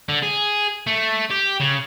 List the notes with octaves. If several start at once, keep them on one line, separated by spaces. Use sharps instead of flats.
D3
G#4
A3
G4
C#3